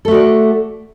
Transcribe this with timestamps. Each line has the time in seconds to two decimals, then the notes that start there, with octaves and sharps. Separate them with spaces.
0.05 A4
0.08 A3
0.11 F#4
0.14 D5